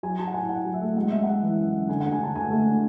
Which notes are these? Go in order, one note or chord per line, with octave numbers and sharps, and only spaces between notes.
F#3 G#5
F#3 A5
F#5
A2 G#5
A2 F#5
F#3
E5
A3
G#3 F#5
G#3 E5
G#3 F#5
E3
F#2
F#2
D3 G#5
F#5
D2
G#5
D3 A5
D2 G#5
A3
D3